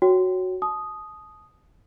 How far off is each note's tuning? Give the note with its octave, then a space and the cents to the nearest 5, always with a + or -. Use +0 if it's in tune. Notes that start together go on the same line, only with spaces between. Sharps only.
F#4 +0 C#5 +0 G5 -15
A5 -35 D#6 +0